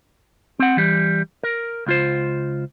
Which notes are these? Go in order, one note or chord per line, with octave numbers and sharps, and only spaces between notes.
C4 F#5
E3 G3
A#4
C#2 F4 C5